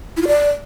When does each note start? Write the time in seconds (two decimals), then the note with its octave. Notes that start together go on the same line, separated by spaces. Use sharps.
0.17 E4
0.22 F4
0.27 D5